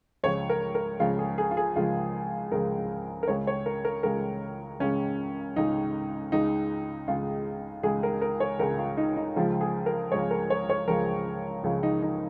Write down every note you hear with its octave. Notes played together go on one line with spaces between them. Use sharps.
C#2 C#3 F3 G#3 C#5
A#4
A#4
C#2 C#3 F3 G#3 F4
G#4
G#4
F4
G#4
C#2 C#3 F3 G#3 F4
C#2 C#3 F3 G#3 A#4
A#4
C#2 C#3 G#3 C#5
C#5
A#4
A#4
C#2 C#3 G#3 A#4
C#2 C#3 G#3 C#4
C#2 C#3 G#3 D#4
C#2 C#3 G#3 D#4
C#2 C#3 G#3 F4
C#2 C#3 G#3 G#4
A#4
A#4
C#5
C#2 C#3 G#3 A#4
F4
D#4
D#4
C#2 C#3 F3 G#3 F4
G#4
A#4
C#2 C#3 F3 G#3 C#5
A#4
C#5
C#5
C#2 C#3 F3 G#3 A#4
C#2 C#3 F3 G#3
D#4
D#4